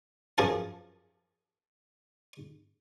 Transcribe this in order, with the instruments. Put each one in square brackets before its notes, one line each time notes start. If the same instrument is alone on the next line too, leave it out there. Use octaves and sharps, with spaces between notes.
[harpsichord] F#2 F3 G#4 A#4 A5